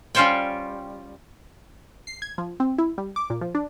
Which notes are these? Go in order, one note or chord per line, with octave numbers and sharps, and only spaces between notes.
G3 C#4 F4 C5 C#5 G5
C7
G#6
F3
C4
E4
G3
D6
A#2
F3
D4